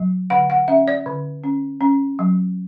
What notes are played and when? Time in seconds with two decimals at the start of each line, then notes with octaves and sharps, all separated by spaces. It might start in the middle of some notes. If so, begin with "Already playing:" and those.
Already playing: F#3
0.30 D3 F#5
0.50 F#5
0.68 C#4 E5
0.88 D5
1.06 D3
1.44 C#4
1.81 C#4
2.19 F#3